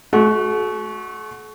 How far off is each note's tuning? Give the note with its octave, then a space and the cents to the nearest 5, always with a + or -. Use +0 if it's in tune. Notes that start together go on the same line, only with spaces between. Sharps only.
A3 -45 F#4 +0